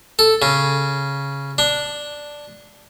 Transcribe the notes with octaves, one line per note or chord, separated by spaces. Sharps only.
A4
C#3
D4